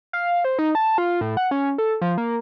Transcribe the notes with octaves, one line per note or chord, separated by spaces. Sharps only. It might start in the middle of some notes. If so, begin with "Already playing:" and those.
F5
C5
D#4
A5
F4
A2
F#5
C#4
A4
F3
A#3